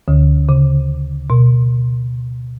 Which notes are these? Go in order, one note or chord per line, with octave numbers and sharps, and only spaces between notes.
D2 D3
C#3
B2